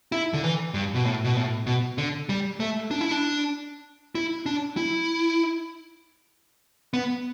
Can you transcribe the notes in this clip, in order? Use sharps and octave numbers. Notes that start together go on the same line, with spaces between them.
E4
D3
E3
G2
B2
A2
B2
A2
B2
D3
G3
A3
D4
E4
D4
E4
D4
E4
B3